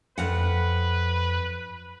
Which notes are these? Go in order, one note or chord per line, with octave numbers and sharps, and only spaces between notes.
F2 B4 F#5